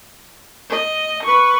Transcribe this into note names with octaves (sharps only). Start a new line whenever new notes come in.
D#5
B4 C#6